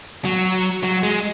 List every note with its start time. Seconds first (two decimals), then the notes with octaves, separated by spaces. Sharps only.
0.25 F#3
0.83 F#3
1.03 G#3